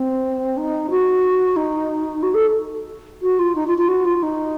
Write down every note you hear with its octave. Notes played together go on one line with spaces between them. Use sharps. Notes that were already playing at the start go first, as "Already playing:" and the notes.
Already playing: C4
D#4
F#4
D#4
F#4
A4
F#4
F4
D#4
F4
F4
F#4
F4
D#4